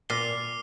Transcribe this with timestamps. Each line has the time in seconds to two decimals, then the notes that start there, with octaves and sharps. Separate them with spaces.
0.09 A#2 D6 F6 C7 D#7 G7